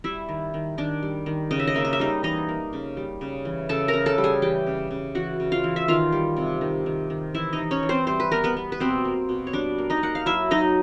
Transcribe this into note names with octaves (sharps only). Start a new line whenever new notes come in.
G3 E4 E5
D#3
D#3
D#3 D4 D5
G3
D#3
C#3 D#5
E5
D#5
A#3 E5
D#5
E5
G3 D#4 D#5
E3 D#4 D#5
A#3
C#3
G3
C#3
E3
C#3 A4 A5
A#4 A#5
C#3
A4 A5
G3
G#4 G#5
E3 G4 G5
C#3
C#3
E3 F#4 F#5
C#3
F4 F5
E3
E5
D#3 F4 F5
G3
C3
D#3
D#3
D#3
E3 E4 E5
D#4 D#5
E3
C#4 C#5
E3
C4 C5
G3 C5
B4
B3 A#4
B3 B4
B3
B4
B2 C4 C5
A#3
B2
C#5
G3 D4 D5
A#3
D#4 D#5
A#3 F#5
F5
F#3 E4 E5
F#3 D#4 D#5